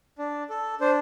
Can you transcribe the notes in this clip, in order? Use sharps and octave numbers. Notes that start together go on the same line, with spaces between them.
D4
A4
D4 C5